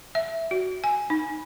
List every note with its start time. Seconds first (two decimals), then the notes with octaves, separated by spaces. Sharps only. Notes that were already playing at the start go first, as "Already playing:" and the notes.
0.15 E5
0.51 F#4
0.84 G#5
1.10 D#4